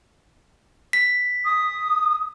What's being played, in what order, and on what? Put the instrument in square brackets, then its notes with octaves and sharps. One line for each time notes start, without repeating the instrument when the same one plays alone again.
[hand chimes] B6
[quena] D#6